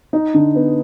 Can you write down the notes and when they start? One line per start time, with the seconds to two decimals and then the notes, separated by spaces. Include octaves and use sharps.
0.13 D#4
0.34 D3
0.55 B3